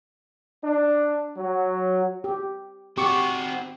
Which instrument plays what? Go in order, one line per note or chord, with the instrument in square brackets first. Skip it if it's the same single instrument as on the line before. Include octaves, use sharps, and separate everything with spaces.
[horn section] D4
F#3
[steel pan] G4
[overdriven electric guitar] C4 F#4 [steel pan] G4 C#6 D6